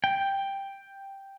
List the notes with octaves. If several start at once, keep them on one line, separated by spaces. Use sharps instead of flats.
G5